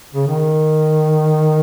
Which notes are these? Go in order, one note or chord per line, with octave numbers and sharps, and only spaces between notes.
C#3
D#3